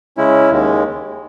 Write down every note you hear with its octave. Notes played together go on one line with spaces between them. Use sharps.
C#3 G#3 C#4 E4
D#2 D#3 G#3